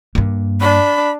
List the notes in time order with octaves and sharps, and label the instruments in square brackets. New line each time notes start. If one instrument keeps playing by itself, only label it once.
[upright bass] G2 A#3
[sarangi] D4 [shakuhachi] B5